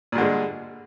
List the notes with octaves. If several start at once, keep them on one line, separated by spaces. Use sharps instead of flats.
G2 A#2 D3 G#3